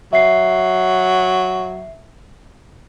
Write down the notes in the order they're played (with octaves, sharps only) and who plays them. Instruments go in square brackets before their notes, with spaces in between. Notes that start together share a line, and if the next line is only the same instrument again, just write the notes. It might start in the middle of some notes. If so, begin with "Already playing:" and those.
[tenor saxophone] F#3 [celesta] E5 C7